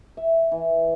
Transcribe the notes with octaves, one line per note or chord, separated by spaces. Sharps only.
E5
E3